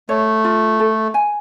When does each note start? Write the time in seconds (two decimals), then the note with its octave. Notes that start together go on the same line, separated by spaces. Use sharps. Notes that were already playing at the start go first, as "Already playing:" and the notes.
0.09 A3 C#5
0.44 F4
0.80 A4
1.14 G#5